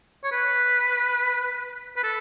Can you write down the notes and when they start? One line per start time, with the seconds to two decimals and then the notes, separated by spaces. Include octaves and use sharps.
0.24 C#5
0.32 B4
1.97 B4
2.04 A4